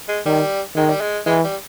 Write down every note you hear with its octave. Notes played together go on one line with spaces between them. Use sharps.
G#3
D#3 G3
D#3 G#3
G3
G#3
E3 G#3
G3